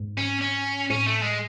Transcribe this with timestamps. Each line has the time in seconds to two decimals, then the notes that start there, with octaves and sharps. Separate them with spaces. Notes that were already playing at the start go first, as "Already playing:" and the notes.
Already playing: G#2
0.18 C#4
0.41 C#4
0.90 A2 C#4
1.06 A3
1.22 G#3